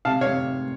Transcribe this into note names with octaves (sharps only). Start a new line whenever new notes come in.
C3 F5 A5
C#5 F5
C3